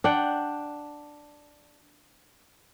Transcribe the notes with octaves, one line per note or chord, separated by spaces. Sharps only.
D4 F#5 G5